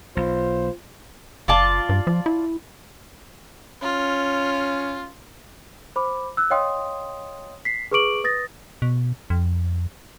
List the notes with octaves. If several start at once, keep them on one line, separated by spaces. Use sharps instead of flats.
B1 F4 C5
F#1 F4 D5 A5
G2
F3
E4
C#4 F4
C5 B5 D6
E6 F#6
C#5 D#5 F5 G5 C6 D#6
B6 C7
G#4 B4 C#6 D6 D7 F#7
B4 D#6 A6 A#6
B2
F2